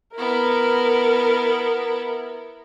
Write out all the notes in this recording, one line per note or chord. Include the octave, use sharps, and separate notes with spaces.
B3 E4 A#4